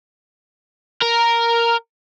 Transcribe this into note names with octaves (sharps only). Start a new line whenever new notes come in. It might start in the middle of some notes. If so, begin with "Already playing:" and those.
A#4